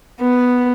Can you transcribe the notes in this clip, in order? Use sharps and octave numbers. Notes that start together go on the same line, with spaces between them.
B3